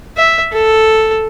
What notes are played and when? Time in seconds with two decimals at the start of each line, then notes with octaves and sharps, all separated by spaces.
0.16 E5
0.52 A4